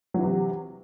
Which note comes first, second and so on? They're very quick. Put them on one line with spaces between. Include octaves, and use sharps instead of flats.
F#3 E3 C3